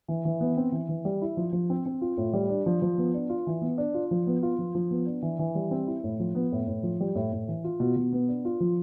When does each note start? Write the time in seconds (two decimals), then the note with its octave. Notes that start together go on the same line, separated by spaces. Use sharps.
0.08 E3
0.25 E3
0.41 B3
0.57 C4
0.72 E3
0.89 E3
1.05 G3
1.22 E4
1.37 F3
1.53 F3
1.70 C4
1.86 C4
2.01 F4
2.17 A2
2.33 G3
2.49 D4
2.66 F3
2.82 F3
2.98 B3
3.14 D4
3.29 F4
3.47 E3
3.62 B3
3.78 D4
3.94 F4
4.11 F3
4.27 B3
4.43 F4
4.59 F3
4.75 F3
4.91 B3
5.06 D4
5.22 E3
5.39 E3
5.55 G3
5.71 C4
5.87 E4
6.04 A2
6.20 F3
6.35 B3
6.52 A2
6.67 A2
6.83 F3
7.00 G3
7.15 A2
7.32 A2
7.48 E3
7.64 F4
7.80 B2
7.96 B2
8.13 B3
8.28 D4
8.45 F4
8.60 F3